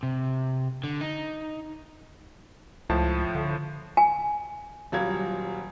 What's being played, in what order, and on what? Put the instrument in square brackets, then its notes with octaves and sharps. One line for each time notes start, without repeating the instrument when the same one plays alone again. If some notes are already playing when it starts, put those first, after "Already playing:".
[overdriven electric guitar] C3
D3
D#4
[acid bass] C#2 [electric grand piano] A2 F3 A5
[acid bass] D3
[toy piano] G#5
[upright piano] D#1 F#3 G3 F4 G#6